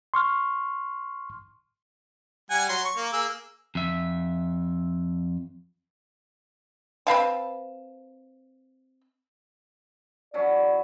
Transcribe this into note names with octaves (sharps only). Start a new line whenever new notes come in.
C6 C#6 F6
G3 F#5 G#5
F#3 C6
C#6
A#3
A#3 G#4 E6
F2 E5
C4 B4 F5 A5
E3 F#3 C#4 D5